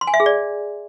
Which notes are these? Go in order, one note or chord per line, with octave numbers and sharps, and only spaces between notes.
C6
G#5
E5
G#4
D5